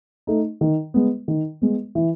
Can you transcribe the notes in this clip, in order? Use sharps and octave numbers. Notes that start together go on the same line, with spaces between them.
A3 D#4
D#3
G#3 B3
D#3
G#3 B3
E3